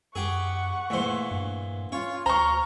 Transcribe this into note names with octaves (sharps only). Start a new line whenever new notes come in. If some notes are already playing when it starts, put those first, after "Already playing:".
F#2 G4 G#4 F#5 C#6
E2 A#2 A3 C5
G2
C#4 F4 C#5
D2 C5 A#5 C#6 F6